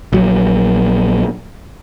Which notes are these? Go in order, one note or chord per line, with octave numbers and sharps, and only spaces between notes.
A#1 F#3